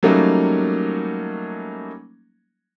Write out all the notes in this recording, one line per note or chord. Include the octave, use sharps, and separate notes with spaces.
F#3 G3 A3 A#3 C#4 D#4